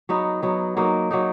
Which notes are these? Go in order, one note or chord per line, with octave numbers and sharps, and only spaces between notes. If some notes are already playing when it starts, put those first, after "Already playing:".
F#3 B3 D#4
F#3 B3 D#4
F#3 A#3 D#4
F#3 A#3 D#4